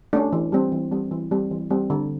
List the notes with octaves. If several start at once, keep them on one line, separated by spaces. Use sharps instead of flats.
A3 C#4 D4
E3
G3 C4
E3
G3 C4
E3
G3 C4
E3
G3 C4
D3